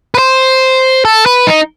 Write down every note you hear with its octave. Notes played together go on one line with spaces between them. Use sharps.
B4
C5
A4
B4
D#4